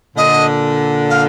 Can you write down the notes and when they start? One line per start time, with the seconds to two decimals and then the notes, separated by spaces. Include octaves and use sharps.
0.17 A#2 D3 D#5
1.10 F5